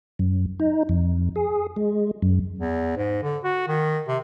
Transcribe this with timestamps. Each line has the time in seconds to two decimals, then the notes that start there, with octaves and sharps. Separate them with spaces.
0.19 F#2
0.60 D#4
0.89 F2
1.36 G#4
1.76 G#3
2.22 F#2
2.59 E2
2.97 G#2
3.23 D3
3.44 F#4
3.68 D#3
4.08 C3